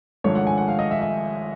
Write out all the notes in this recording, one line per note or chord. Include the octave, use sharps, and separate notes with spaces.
G#1 G#2 F3 A3 D4 C#5
F#5
G#5
F#5
F5
D#5
E5
E5